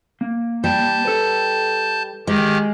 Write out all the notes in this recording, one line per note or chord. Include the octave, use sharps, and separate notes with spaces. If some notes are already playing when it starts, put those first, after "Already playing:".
A#3
G3 A5 G6
A4 B4
D#3 G#3 G4